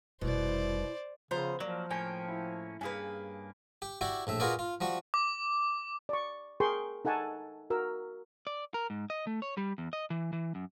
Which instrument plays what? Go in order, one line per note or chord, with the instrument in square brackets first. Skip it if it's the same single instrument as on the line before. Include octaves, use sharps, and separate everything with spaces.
[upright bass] F1 G3 [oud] B2 [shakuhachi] E4 [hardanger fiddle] C5 D5
[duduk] C#3 [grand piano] F3 [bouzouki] B3 C5 A#5
[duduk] F3 [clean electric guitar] F#3 [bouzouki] A#3 [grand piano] D5
[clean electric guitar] A2 A#3 C#4 [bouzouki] G5 [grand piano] G#5
[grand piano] E4
[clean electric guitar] G2 A#3 [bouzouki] C#4 G#4 B4 [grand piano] G#5
[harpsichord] G4
E4 F#4 G4 D5
A#1 A2 E5
F4 F#4 G#4 A#4 B4 D5
F4
F3 G3 F#4
[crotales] D6
[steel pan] D5 C#6
G#4 A#4 G5 C6 C#6
D#4 A4 F#5 G#5 A5 C#6
F#4 A#4 E6
[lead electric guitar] D5
A#4
G#2
D#5
A3
C#5
G3
E2
D#5
E3
E3
F#2